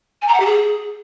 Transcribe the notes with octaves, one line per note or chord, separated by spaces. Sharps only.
G#5
A#5
F#5
G4
G#4